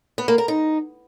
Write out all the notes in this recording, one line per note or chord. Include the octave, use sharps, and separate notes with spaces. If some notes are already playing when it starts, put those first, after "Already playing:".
B3
A#3
A#4
D#4